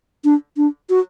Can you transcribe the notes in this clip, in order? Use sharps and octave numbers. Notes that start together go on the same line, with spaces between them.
D4
D4
F#4